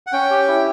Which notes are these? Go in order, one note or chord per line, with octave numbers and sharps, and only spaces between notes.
F#5
C#4 G5
G4
E4